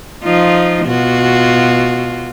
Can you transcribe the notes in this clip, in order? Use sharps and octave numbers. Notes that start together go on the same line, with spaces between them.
F3 D#4 F4
B2 F4 F#4